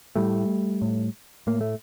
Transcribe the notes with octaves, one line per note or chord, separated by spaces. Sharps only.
A2 G3 A3
A2
A2 A#3
A3